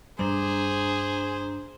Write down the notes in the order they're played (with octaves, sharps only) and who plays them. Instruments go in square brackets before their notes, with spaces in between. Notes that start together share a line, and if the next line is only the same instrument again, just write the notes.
[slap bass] G2 G3 [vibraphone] D4 A#5 [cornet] G#4 [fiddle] C5